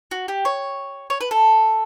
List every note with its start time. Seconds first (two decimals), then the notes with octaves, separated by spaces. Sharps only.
0.11 F#4
0.28 G4
0.45 C#5
1.10 C#5
1.21 B4
1.31 A4